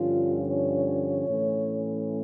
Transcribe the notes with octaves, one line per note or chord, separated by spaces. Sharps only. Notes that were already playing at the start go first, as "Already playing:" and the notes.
Already playing: G2 D3 F3 C#4 F4
C#5
A2 E3 A3 C#4